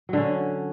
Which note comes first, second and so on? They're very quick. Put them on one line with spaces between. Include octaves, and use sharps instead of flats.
F#3 D3 C#4